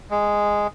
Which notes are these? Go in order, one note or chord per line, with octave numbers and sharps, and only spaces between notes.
G#3